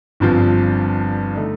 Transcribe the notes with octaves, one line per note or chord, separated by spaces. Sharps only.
G1 G2 F3 C4 F4
D3 A3 D#4